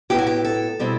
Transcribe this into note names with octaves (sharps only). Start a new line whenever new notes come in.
A2 F#3 B3 E4 G4
F#4
G4
A4
B2 G3 C4 E4